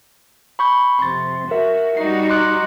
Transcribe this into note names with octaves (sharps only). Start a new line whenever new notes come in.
B5 C#6 G6
F2 C3 C6 A6
F#4 A#4 E5
G3 D#4 F#4 C7
C6 D6 F#6